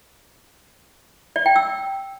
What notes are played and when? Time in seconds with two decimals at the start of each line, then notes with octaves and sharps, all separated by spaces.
1.36 D5
1.46 G5
1.56 E6